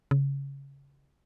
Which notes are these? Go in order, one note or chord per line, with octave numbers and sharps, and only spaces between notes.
C#3